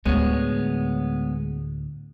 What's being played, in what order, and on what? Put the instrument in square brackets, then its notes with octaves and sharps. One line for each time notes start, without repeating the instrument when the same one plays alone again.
[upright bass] D2 A2 [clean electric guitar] G#3 B3 C#5